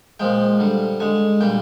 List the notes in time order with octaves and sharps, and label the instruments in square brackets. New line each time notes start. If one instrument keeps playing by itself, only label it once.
[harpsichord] A#2 F3 G#3 G5
D3 G3
D3 G#3 G#5
A#2 G3 G5